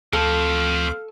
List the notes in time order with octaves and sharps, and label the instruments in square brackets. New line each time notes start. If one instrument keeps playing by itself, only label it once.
[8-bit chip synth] D2 [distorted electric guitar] F3 C4 [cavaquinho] A4 [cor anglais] F5